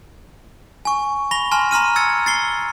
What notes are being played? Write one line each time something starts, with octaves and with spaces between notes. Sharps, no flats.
G#5 C#6
B5 A#6 F7 G7
G#5 A5 C6 F6
A#5 C6 F6 D#7
E6 G#6 A6 C#7
A6 C7 G7